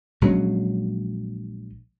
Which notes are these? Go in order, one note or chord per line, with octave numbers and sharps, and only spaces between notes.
A#1 F#3 G#3 C#4